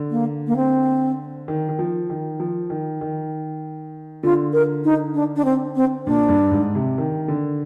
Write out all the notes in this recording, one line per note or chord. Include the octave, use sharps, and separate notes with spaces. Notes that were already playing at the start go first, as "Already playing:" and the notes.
Already playing: D3
A#3
A#3
C4
D#3
D#3
F3
D#3
F3
D#3
D#3
D3 F4
A#4
D#4
D4
D4
C4
C4
A#2 D4
G2
G#2
C3
D#3
D3